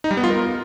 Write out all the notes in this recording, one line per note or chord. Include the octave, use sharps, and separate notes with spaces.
D#4
G3
B3
F4
A#4